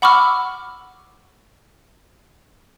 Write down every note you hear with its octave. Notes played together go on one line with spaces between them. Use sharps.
F#5 B5 C#6 D6 E6 F6